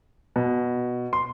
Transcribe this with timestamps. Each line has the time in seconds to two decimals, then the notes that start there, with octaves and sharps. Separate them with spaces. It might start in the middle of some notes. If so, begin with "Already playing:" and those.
0.36 B2
1.13 C6